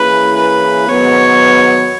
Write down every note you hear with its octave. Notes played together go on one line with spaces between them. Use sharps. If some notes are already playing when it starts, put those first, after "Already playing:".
Already playing: E3 A#3 C#4 E4 G#4 B4
B4
G#2 D#3 F#3 B3 C#5